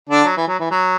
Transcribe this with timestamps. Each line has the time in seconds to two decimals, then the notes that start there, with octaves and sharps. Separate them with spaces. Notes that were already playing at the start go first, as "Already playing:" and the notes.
0.09 D3 D4
0.25 F#3
0.37 E3
0.48 F#3
0.60 E3
0.71 F#3